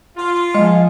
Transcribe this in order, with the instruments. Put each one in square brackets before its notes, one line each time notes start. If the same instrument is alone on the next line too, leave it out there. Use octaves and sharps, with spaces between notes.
[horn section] F4
[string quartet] F3 G#4 [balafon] G#3 D#5